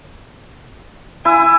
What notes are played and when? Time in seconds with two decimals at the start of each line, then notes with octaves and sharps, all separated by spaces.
1.25 E4 G#5